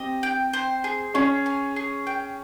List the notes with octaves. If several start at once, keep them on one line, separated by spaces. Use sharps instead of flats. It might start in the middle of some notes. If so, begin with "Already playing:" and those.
Already playing: C4 G4 D#5
G5
C5
G#4
C#4 G#4 C#5
G#5
G#4
G5